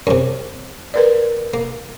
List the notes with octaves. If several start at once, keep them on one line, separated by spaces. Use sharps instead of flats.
F#2 C3
A#4 B4 D5
A#3